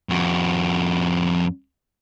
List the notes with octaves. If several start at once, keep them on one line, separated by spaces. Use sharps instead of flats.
F2 F#4